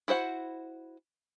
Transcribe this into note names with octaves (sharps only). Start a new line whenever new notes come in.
E4 F#4 C5 F#5